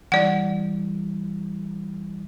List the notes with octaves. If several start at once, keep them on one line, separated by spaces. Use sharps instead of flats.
E3 G3 E4 D5 F#5